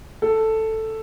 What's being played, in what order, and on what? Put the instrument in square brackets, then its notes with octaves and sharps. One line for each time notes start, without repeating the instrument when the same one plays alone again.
[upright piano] A4